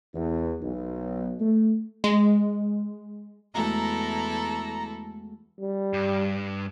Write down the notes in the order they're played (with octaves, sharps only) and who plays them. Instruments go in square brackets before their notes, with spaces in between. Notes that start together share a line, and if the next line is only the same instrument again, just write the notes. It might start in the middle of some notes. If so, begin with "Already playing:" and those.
[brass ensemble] E2
B1
A3
[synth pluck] G#3
[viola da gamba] E2 E4 A4 [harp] G#3 A3 F#4 [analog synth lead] A#5
[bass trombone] G3
[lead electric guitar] G2